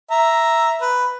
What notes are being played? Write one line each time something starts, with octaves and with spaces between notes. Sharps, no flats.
E5 A#5
B4